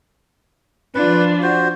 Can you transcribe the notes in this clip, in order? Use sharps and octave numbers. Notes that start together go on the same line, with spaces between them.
F3 D4 F4 B4
F#4 C5